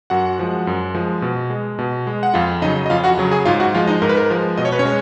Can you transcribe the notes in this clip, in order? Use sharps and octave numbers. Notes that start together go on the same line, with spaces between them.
F#2 F#4 F#5
F3 G#3
F#2
F3 G#3
B2
G#3
B2
G#3
F#5
F2 F4 F5
C#3 F#3 D#4 D#5
D#5
F2 F4 F5
F#4 F#5
C#3 F#3
G#4 G#5
G#2 F4 F5
F#4 F#5
F3 G#3 F4 F5
D#4 D#5
G#2 A#4
B4
A#4
F3 G#3
B2 D#5
C#5
B4
C#4 C#5
G#3